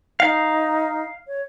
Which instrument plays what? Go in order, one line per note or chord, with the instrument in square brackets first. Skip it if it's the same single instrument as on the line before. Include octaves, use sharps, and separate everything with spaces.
[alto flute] D#4 [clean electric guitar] F5
[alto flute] C#5